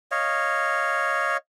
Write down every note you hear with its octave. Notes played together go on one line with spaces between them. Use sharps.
C#5 D#5 F5